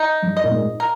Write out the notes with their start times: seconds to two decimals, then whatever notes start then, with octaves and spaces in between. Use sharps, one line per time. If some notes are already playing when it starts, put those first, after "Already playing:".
Already playing: D#4
0.22 G2
0.37 D#5
0.44 A#2
0.51 G#2
0.80 A#4